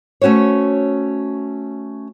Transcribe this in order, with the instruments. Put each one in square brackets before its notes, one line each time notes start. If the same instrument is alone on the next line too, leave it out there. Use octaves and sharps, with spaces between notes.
[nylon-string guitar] A3 C#4 F#4 C5 C#5